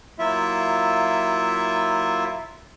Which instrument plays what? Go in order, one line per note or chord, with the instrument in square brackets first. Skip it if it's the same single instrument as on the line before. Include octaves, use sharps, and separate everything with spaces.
[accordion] F#3 A#3 E4 F4 E5